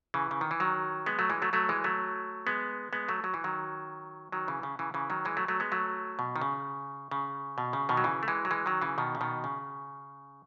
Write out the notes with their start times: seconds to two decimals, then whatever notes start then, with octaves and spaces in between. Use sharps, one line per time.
0.14 C#3 E3
0.31 C#3
0.41 D#3
0.51 E3
0.60 D#3 F#3
1.06 G#3 B3
1.19 F#3 A3
1.30 E3 G#3
1.42 F#3 A3
1.53 F#3 A3
1.69 E3 G#3
1.84 F#3 A3
2.47 G#3 B3
2.93 G#3 B3
3.09 F#3 A3
3.24 F#3
3.34 E3
3.44 D#3 F#3
4.32 D#3 F#3
4.48 C#3 E3
4.63 C#3
4.79 C#3 E3
4.94 C#3 E3
5.10 D#3 F#3
5.25 E3 G#3
5.37 F#3 A3
5.48 F#3 A3
5.60 G#3 B3
5.72 F#3 A3
6.19 B2
6.36 D#3
6.42 C#3
7.11 C#3
7.58 B2
7.73 C#3
7.89 B2 D#3
7.97 F#3
8.04 C#3 E3
8.23 A3
8.28 E3 G#3
8.45 F#3
8.51 E3 G#3
8.66 D#3 F#3
8.82 C#3 E3
8.98 B2 D#3
9.15 C#3
9.21 B2 D#3
9.44 C#3